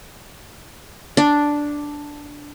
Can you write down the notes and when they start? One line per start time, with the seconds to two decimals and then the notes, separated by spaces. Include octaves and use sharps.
1.17 D4